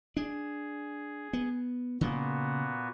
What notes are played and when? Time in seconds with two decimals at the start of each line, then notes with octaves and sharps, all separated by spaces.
0.17 D4 G#4
1.33 B3
2.01 A#2 C#3 A#3 B3 F#4